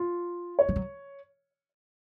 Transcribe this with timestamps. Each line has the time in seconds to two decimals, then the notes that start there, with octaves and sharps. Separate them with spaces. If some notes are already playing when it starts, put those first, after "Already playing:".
Already playing: F4
0.59 C#5
0.69 F3
0.76 F#3